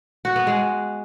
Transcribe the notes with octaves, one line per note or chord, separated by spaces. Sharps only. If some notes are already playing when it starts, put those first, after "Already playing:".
F#4
B3
G#3